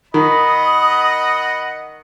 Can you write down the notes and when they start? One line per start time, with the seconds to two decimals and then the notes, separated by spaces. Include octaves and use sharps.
0.14 D#3 D#5 F#5 B5 D#6